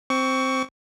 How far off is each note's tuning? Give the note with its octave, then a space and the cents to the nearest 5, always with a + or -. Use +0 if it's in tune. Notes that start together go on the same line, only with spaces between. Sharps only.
C4 +0 C#6 +20